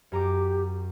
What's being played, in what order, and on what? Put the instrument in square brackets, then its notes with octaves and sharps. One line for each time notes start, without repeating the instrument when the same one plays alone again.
[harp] F#2 A#5 D6 [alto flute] G4